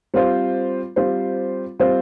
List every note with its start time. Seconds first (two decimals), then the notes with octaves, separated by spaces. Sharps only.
0.14 G3 C4 F4 C5
0.96 G3 C4 F4 C5
1.79 G3 C4 F4 C5